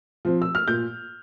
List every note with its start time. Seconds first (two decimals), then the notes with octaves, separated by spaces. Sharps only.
0.25 F3 C4
0.42 E6
0.55 F6
0.68 A#2 G6